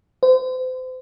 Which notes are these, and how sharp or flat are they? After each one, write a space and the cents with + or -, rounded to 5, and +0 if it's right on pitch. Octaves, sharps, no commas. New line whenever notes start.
C5 -35